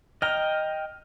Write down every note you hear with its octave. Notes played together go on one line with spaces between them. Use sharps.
D#5 G5 A#5 F6